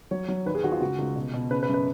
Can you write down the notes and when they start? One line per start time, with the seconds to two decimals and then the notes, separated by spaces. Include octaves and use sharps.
0.11 F#3 C#5
0.28 F#3
0.46 D#2 B4
0.55 G#4
0.63 D#2 F#4
0.72 F4
0.81 C#2 F#4
0.98 C#2
1.16 B2
1.33 B2
1.50 C#3 B4
1.63 B4
1.69 F#2
1.74 B4